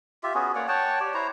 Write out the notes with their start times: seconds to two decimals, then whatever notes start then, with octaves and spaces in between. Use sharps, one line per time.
0.23 F4 G4 E5
0.35 B3 C#4 F#4 G#4
0.55 A#3 C#5 D5 F#5
0.68 C#5 F#5 G5 A5
1.00 G4 D5
1.14 E4 C5 C#5 A#5